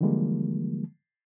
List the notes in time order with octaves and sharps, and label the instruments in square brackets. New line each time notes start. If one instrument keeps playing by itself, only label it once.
[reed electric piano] D3 E3 F3 G3 G#3 A#3